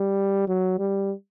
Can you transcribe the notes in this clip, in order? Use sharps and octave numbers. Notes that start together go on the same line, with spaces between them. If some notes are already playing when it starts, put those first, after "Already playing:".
Already playing: G3
F#3
G3